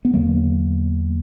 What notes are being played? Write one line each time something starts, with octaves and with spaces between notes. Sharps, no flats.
B3
E2 D3 F#3 A#3